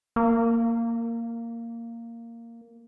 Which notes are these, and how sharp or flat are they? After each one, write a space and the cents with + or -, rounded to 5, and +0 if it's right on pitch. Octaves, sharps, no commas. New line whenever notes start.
A#3 -10